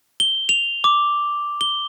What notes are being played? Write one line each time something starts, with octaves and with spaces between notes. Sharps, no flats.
G7
F7
D6
G7